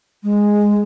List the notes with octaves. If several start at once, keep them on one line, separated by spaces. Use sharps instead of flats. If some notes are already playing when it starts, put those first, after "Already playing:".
G#3